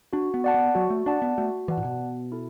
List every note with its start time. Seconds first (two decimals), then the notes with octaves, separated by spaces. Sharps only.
0.13 D4 F#4
0.34 B3
0.44 D5 F#5 A5
0.54 B3
0.75 F#3 F#4
0.90 A3
1.06 D4 D5 F#5 A5
1.22 B3
1.37 A3 F#4
1.68 E3 D5 F#5 A5
1.77 A2
1.84 B2
2.00 B3
2.32 E4 A4